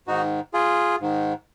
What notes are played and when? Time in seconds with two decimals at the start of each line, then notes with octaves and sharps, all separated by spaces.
0.08 G#2 D#3 D#4 F#4
0.54 F4 G#4
1.01 G#2 D#3